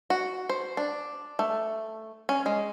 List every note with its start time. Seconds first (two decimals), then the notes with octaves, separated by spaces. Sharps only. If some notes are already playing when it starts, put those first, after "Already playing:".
0.10 F#4
0.49 C5
0.77 D4
1.39 A3
2.29 C#4
2.46 G#3